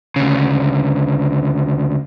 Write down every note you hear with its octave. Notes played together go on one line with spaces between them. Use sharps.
D2 C#3